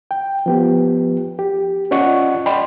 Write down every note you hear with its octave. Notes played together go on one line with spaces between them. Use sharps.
G5
F3 B3 G4
G4
C#4 F4 D5 D#5 F#5 C#6
D5 D#5 G5 B5 C6